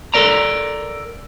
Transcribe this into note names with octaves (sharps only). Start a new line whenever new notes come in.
A4 A#4 D5 A#5